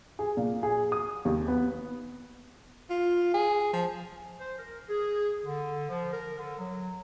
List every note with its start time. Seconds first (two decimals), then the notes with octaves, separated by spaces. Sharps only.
0.19 G#4
0.37 A#2
0.63 G#4
0.92 D#6
1.25 D#2
1.47 B3
2.90 F4
3.34 G#4
3.73 F3
4.40 C5
4.58 A#4
4.89 G#4
5.45 D3
5.89 F3
6.12 A#4
6.38 D3
6.58 F#3